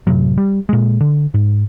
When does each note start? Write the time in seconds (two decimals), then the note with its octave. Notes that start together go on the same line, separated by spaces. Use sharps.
0.07 A1 F#2 C3 F#3
0.38 G3
0.69 A#2 G#3
1.00 D3
1.34 G#2